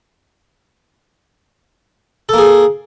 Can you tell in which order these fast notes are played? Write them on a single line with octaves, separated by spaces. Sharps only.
A4 A#3 G#4